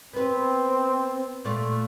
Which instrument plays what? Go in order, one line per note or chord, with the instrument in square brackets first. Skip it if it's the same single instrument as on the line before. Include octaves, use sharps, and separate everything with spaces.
[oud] B3 B4 [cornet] C4
[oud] A#2 A3